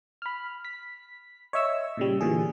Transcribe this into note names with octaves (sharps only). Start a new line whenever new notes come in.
B5 F6
B6
C#5 D#5 E5 C#6 E6
A#2 C#3 G3
A#2 D3 E3 G#4